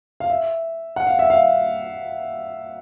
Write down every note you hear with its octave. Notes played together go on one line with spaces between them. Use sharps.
F5
E5
F#5
F5
E5
F5